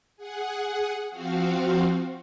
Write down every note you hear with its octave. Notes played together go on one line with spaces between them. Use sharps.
G#4 F#5
F3 C4 F#4 F5